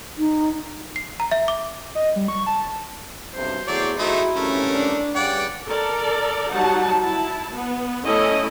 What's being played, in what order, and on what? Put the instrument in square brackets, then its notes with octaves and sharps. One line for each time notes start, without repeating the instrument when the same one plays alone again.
[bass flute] D#4
[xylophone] C7
A#5
E5
D6
[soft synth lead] D#5
G3
C#6
A5
[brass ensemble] B1 G2 C3 [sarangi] C5
[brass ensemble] E2 A2 [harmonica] F#3 C#5 D5
[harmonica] A3 D#4 C5 [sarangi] E4 [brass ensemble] F#4 G#4 E5
[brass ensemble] C2 G2 C#4 [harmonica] A3 A#4
[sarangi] D4
[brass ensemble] G2 C#3 [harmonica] D5 G5 [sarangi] F#5
[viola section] A4 A#4 D5
F#3 G3 D#4 F#5 A5
E4 A5
B3
A3 C#4 E4 A4 D#5